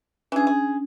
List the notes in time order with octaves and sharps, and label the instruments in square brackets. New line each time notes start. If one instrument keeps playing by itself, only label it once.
[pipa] E3 G#4 [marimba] C#4 D4
[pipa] G#4